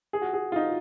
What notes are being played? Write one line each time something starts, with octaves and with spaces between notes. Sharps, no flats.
G#4
F#4
G#4
F4
D#4